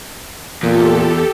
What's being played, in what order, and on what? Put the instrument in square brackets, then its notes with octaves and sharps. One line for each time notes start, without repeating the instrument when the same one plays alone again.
[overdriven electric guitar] E2 [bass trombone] A#2 [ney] F4 [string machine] G4 A4